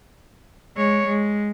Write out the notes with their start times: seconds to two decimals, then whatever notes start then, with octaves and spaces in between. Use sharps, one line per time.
0.77 G#3 C#5
1.07 G#3